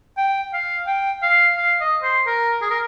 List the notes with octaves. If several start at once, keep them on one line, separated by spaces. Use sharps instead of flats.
G5
F5
G5
F5
F5
D#5
C5
A#4
G#4
A#4